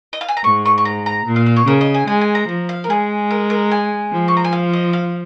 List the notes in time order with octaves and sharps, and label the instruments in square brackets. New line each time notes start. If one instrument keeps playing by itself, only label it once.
[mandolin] D#5
F5
G#5
A#5
[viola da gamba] G#2 [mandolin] C#6
[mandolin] C#6
C#6
A#5
A#5
[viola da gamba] A#2
[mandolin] F5
F5
C#5
[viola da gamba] C#3 [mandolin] A#4
[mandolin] D#5
G#5
[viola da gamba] G#3 [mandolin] G#5
[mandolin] G#5
A#5
[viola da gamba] F3 [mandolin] A#5
[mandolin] F5
A#4
[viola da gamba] G#3 [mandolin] G#4
[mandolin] A#4
A#4
G#5
[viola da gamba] F3
[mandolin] C#6
A#5
G#5
F5
D#5
F5